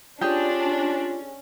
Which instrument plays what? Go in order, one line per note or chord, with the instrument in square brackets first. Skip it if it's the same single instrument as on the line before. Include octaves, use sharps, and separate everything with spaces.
[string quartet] C#4 [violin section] D4 [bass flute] F4 [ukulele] G4 G#4